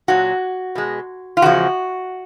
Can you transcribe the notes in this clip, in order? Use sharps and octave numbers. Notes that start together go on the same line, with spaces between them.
A#2 F#3 F#4
B2 G#3
F4
E2 C#3 F3 G#3 F#4